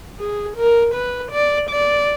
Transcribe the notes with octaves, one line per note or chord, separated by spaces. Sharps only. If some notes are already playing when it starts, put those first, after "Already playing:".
G#4
A#4
B4
D5
D5